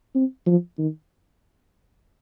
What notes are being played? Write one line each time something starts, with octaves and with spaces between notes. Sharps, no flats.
C4
F3
D#3